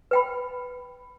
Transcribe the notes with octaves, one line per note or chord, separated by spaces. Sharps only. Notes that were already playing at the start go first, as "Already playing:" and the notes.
B4 G5 B5